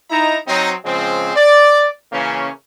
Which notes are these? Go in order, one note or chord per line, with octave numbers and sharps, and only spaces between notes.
D#4 E4 A#5
F#3 C4 D#4
C#3 F3 G#3 C4
D5
C#3 E3 A#3 C#4